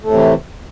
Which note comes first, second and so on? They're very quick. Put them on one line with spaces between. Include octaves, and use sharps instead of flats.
A3 A2 C3 E3